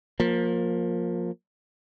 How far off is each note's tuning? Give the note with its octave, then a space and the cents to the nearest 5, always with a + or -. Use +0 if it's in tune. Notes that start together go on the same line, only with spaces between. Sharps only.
F3 +20 A#3 +0